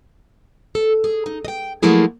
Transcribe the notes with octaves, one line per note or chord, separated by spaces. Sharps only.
A4
G#4
D#4
D#5 G5
F3 F#3 A3 A#3 E4 G#4